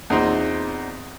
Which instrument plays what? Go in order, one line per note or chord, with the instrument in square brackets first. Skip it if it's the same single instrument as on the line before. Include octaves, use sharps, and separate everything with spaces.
[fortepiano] E2 A#2 C4 D#4 C6 D#6